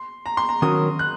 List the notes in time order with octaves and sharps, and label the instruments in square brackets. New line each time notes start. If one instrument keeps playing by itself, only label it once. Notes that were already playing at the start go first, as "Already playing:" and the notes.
Already playing: [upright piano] C6
A#5
C6
A#5
[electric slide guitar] D#3 F#3 C#4 F#4 A#4 [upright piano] D#6
[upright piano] F#6